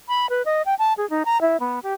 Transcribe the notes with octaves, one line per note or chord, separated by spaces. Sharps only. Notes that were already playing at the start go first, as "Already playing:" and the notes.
B5
B4
D#5
G5
A5
G#4
D#4
A#5
E4
B3
G4